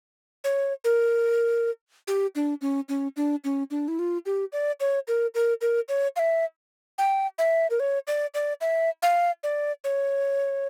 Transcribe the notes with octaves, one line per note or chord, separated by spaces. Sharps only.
C#5
A#4
G4
D4
C#4
C#4
D4
C#4
D4
E4
F4
G4
D5
C#5
A#4
A#4
A#4
C#5
F5
E5
G5
E5
A#4
C#5
D5
D5
E5
F5
D5
C#5